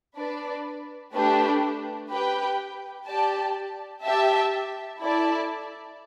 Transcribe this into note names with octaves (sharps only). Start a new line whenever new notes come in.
D4 B4 D5
A3 D4 G4 B4
G4 B4 G5
G4 D5 A5
G4 E5 A5
E4 A4 D5 A5